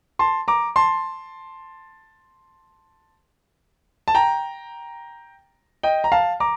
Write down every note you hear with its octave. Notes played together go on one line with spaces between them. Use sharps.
A5 C6
A#5 D6
A5 C6
A5
G5 A#5
D#5 G5
A#5
F5 A5
A#5 D6